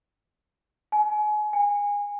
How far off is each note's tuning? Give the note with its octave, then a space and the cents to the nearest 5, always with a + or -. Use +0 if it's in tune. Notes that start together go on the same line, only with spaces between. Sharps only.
G#5 +30
G#5 -25